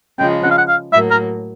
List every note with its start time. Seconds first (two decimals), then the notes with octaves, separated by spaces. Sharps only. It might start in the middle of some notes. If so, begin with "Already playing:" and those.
0.19 C#3 F3 G#3 G5
0.43 F#5
0.51 F5
0.58 F#5
0.68 F5
0.93 A2 F#3 A#3 E5
1.11 A#4